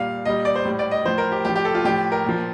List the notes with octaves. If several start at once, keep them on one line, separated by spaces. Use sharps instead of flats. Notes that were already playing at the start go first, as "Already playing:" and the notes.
Already playing: A#2 G3 F5
A#2 G3 D#5
D5
C5
A2 G3
D5
D#5
A2 F3 C5
A#4
G4
A2 F3 G4
G4
A4
F4
A2 F3 G4
A#4
A#2 F3